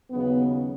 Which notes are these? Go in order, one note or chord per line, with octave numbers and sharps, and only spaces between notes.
D#2 C#3 F#3 B3